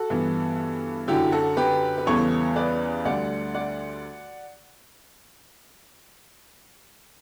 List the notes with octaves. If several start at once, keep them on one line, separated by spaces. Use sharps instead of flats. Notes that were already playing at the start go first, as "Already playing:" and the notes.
Already playing: F#4 A4
G2 E3 B3
F#2 D3 F#3 E4 G4
F#4 A4
G4 B4
B4
E2 C#3 E3 G3 B3 A4 C#5
B4 D5
D2 D3 G3 D5 F#5
D5 F#5